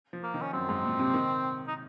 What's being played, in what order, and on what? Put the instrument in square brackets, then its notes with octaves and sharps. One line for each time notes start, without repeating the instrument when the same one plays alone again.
[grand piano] F3
[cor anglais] A#3
[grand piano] D#3
[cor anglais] C#4
[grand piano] F#2 [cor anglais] C4
[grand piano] G#2
A#2
C3
D#3
[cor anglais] D#4